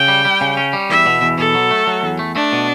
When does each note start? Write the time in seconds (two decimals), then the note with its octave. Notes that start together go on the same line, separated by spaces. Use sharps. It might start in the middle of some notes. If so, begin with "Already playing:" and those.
Already playing: C#3 G5
0.08 G3
0.25 G3
0.41 C#3
0.57 C#4
0.73 G3
0.90 E2 E5
1.06 B2
1.22 E2
1.38 B2 A4
1.55 F#3
1.71 A3
1.87 F#3
2.03 E2
2.19 A3
2.35 A3 D4
2.52 B2